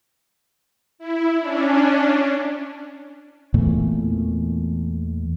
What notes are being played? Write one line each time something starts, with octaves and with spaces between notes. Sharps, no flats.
E4
C#4 D4
E2 A#2 E3 A3